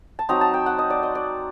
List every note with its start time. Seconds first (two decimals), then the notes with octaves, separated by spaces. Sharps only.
0.19 A5
0.29 F#3 C4 D#4 A#5
0.41 A5
0.54 G5
0.66 F#5
0.79 D#5
0.90 D5
1.03 D#5
1.15 D5